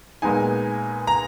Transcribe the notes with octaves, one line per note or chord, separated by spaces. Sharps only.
A#2 G#3 B3 D#4 G#5
A#5